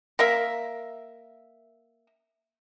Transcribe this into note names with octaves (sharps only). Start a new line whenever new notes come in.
A#3 A#4 E5